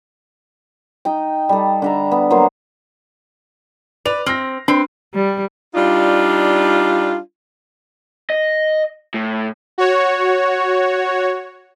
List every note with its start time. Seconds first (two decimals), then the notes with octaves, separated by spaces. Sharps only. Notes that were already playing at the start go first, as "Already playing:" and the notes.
1.05 D#4 D#5 G5
1.49 G3 A4
1.82 D3 E5 A#5
2.11 B3
2.30 F#3 A#3 B3 C5
4.06 B4 D5 F7
4.26 C4 F6 A#6
4.68 C4 D4 B4
5.14 G3
5.75 G3 D4 D#4 F4
8.30 D#5
9.14 A2
9.78 F#4 C#5